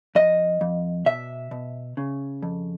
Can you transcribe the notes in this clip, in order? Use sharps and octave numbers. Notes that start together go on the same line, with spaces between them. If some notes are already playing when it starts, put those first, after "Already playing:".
F2 D#5
F2
B2 E5
B2
C#3
F2